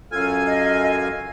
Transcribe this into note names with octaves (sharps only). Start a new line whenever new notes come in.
F#2 F4 A4 F5 G#5
D#5